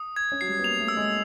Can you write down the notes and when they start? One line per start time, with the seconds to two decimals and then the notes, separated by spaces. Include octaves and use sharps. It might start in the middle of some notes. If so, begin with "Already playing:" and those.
Already playing: D#6
0.16 G#6
0.32 C#4
0.41 F#3 C7
0.48 G3
0.59 B3
0.64 A#3 F7
0.80 A3
0.88 E6
0.97 G#3